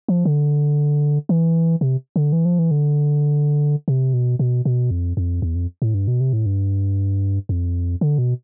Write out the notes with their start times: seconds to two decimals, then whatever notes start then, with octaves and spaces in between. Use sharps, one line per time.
0.08 F3
0.25 D3
1.29 E3
1.81 C3
2.16 D3
2.33 E3
2.45 F3
2.59 E3
2.71 D3
3.88 C3
4.13 B2
4.39 B2
4.65 B2
4.91 F2
5.17 F2
5.42 E2
5.55 F2
5.82 A2
5.94 G2
6.08 B2
6.20 C3
6.33 A2
6.46 G2
7.49 F2
8.01 D3
8.18 B2